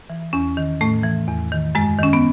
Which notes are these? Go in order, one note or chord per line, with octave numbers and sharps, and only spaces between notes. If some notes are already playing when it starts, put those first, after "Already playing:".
E3
E2 C#4
D#3
A2 A3
E3
E2
D#3
F#2 G#3
D#3 C#4
B3